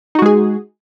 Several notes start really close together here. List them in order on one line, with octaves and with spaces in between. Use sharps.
D#4 F#4 G#3 G#4